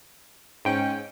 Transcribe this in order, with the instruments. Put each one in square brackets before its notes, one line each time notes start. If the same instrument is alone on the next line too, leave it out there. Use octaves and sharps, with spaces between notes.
[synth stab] G#2 G5 [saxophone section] C#4